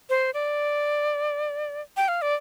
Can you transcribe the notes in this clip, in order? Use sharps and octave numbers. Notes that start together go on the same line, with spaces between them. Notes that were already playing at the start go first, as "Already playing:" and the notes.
C5
D5
G5
F5
D5